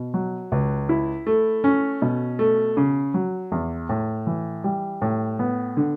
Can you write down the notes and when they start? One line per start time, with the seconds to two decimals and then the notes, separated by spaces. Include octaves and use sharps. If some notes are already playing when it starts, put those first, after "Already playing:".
Already playing: B2
0.14 F#3
0.52 C#2
0.89 E4
1.27 A3
1.64 C#4
2.02 B2
2.39 A3
2.77 C#3
3.14 F#3
3.52 E2
3.89 A2
4.27 E3
4.64 G3
5.02 A2
5.39 B3
5.77 D3